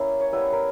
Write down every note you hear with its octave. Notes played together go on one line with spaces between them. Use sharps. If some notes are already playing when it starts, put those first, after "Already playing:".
Already playing: A#3 C#4 E4
C#5
G3 B3 E4 B4
A#4